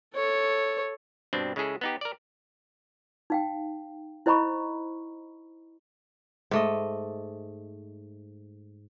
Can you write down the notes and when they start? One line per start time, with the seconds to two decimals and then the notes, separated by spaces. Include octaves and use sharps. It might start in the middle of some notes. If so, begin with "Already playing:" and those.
0.14 A4 C#5
1.33 G2 B2 C4 D4
1.56 C#3 G#3 E4 G#4 A4
1.81 B3 D#4 G4
2.01 A#4 D5
3.30 D#4 F5 G5
4.26 E4 C5 D#5 A#5 B5 C#6
6.51 G#2 A3 D#5